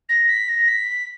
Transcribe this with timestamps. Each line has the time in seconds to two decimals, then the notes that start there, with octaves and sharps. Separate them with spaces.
0.09 A#6
0.29 B6
0.48 A#6
0.68 B6